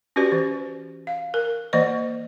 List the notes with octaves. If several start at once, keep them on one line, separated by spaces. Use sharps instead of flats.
C#4 F#4 G4 B4 D5
E3
F5
A#4
E3 A#3 D5 D#5